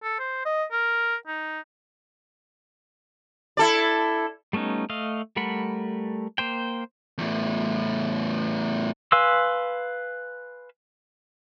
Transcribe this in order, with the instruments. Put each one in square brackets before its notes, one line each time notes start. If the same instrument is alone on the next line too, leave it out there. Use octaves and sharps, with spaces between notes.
[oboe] A4
C5
D#5
A#4
D#4
[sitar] E4 A4 D5
[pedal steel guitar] G3 A3 B3 C#4 D#4
A3 D#5 F5
G3 A3 A#4 F#5 B5
A#3 C5 G5
[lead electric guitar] E2 A2
[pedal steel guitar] B4 F5 G#5 C6 E6